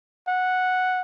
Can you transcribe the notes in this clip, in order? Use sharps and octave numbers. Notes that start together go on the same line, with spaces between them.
F#5